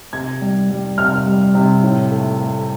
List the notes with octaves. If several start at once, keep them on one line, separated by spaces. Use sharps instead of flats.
C3 G#6
G3
G3
C3 F6
G3
C3
A2
A3
A3